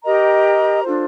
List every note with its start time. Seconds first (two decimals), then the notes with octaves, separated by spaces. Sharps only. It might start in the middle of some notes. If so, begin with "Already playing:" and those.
0.04 G4 A#4 D#5 A#5
0.84 D4 F4 A4 C5